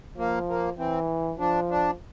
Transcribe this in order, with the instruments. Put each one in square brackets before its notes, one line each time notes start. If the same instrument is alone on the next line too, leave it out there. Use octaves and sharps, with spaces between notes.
[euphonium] F3 [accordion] A#3
[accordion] A#3
[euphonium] E3 [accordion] C4
[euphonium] F3 [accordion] D4
[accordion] D4